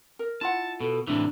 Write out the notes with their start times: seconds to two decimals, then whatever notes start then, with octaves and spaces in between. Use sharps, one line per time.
0.19 A#4
0.41 E4 F4 F#5 A5
0.80 B2 A4
1.07 A2 C3 E3 D4 E4